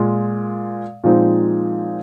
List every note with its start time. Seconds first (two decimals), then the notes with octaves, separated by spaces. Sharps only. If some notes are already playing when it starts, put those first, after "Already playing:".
Already playing: A#2 G#3 F4
1.04 A#2 F3 G#3 C4 D#4